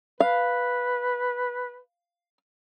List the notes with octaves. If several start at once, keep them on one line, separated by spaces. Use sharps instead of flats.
B4 F5